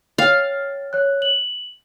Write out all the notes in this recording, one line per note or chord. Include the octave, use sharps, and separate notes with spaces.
C#5 F5 G5 A6
C#5 F#6
F#7